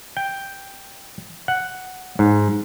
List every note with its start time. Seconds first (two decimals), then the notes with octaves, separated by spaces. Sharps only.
0.17 G5
1.48 F#5
2.19 G#2